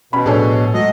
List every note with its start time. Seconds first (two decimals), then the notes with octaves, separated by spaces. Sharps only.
0.13 B2 C#4 B5
0.26 A2 F3 D4 G#4 A4 C#5
0.74 F#3 G#3 A3 D#5